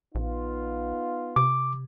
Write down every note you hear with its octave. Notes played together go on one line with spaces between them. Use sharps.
A#1 B3 D#4 F4
C3 D6